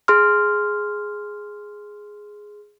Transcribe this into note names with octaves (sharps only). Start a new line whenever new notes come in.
G#4 C6 F6